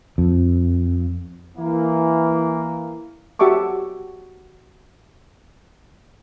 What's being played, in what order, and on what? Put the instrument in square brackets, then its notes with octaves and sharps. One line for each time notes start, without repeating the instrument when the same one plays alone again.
[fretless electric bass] F2
[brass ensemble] E3 A#3
[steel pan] F#4 G4 E5 A5 C#6 D6